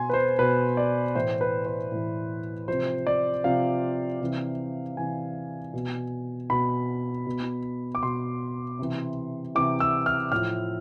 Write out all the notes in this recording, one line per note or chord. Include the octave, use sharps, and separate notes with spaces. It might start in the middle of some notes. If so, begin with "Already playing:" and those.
Already playing: B2 G#5 C6
B4
C5
B2 B4
D5
A2 E3 C5
B4
C5
A2 E3
C3 F3 C5
D5
C3 F3 F5
C3 E3
C3 E3 G#5
B2
B2 B5
B2
D6
B2 C6
C3 E3
C3 E3 D6
E6
F6
A2 F3 F6